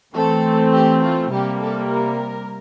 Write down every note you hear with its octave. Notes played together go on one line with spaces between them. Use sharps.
E3 A3 C4 A4
G4
F4
C3 G3 A#3 G4
A4
A#4